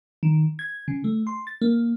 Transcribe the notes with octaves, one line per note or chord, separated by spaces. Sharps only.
D#3
G#6
C#3
A3
C6
A6
A#3